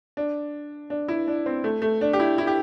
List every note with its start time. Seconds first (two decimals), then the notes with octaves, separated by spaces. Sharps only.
0.17 D4
0.90 D4
1.08 E4
1.28 D4
1.46 C4
1.64 A3
1.82 A3
2.01 D4
2.13 G4
2.20 E4
2.38 E4
2.47 G4